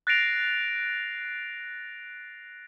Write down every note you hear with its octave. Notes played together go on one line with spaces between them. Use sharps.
F#6 A6 A#6 C7 D7 F7